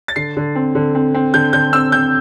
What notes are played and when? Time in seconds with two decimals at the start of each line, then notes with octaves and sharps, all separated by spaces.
0.08 A6
0.16 D3 C7
0.37 D3
0.55 C4
0.75 D3
0.95 C4
1.14 C4
1.34 D3 G6
1.53 D3 G6
1.73 C4 E6
1.92 C4 G6